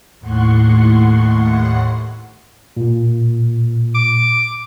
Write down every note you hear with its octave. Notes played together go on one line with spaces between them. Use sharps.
D#2 A2 F#5 C6 C#6
A#2
D6